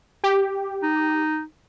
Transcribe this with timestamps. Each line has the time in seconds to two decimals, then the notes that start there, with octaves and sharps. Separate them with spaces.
0.24 G4
0.82 D#4